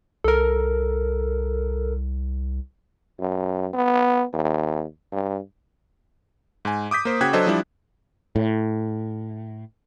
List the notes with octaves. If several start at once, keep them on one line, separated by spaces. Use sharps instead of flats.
C2 A4 A#4
F#2
B3
D#2
G2
G#2 G#5
D6 D#6 G6 B6
A#3 C5
C#3 F#4 G5 F#6 G#6 B6
F#3 D4 A4 C5 D#5
F3 G3 D4 E4
A2